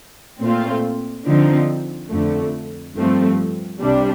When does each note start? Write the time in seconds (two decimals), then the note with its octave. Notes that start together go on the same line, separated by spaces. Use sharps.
0.42 A#2 A3 C4 F4
1.26 D3 F3 C4 D#4
2.10 F2 D3 A3
2.96 G2 F3 A3 C4
3.81 C2 C3 G3 D4